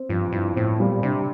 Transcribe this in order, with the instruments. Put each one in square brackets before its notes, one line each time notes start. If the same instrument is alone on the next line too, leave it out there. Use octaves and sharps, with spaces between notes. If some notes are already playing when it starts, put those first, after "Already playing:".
Already playing: [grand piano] C4
[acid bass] G2 [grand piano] F3
[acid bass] G2 [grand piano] E4
[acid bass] A2 [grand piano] C4
[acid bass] A#2 [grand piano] G3
[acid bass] C3 [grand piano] D4